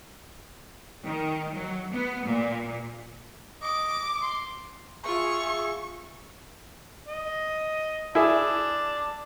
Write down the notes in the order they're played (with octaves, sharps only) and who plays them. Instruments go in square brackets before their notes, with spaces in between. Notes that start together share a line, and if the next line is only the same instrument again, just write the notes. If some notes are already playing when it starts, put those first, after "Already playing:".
[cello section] D#3
F#3
B3
A#2
[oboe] D#5 [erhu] D6
[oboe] C6
[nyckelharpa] F4 [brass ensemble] G#4 E5 [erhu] C#6
[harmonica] D#5
[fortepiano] E4 G#4 [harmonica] D5 A5